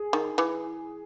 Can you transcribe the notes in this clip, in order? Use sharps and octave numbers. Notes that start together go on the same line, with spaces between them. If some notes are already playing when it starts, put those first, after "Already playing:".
Already playing: G#4
D#3
E3